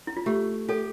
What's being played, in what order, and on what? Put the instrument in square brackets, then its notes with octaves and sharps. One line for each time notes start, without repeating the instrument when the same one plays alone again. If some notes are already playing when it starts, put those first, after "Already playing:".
[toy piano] E4
F4
[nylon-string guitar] A3 [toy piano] G4
[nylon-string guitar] G4 [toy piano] A4